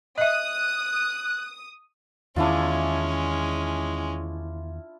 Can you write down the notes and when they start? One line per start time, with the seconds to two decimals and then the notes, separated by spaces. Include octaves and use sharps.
0.18 D#5 E5 D#6 F#6
2.36 E2 D#3 G#3 C#4 D4 E4 F4